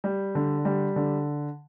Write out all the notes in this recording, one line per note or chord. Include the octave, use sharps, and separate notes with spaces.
G3
D3
G3
D3